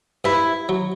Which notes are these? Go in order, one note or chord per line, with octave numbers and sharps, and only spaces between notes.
G2 E4
F#3